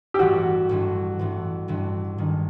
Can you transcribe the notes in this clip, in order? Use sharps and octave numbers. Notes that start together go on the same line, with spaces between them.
G4
A1 G2 E3 F#4
A1 G2 E3
A1 G2 E3
A1 G2 E3
G2 D#3 G#3